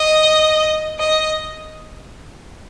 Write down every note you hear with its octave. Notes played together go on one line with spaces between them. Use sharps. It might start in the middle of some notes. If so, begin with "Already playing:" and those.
Already playing: D#5
D#5